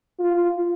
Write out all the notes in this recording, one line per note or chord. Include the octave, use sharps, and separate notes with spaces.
F4